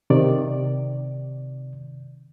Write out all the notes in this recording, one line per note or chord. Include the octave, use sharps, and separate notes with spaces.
C3 D#3 D5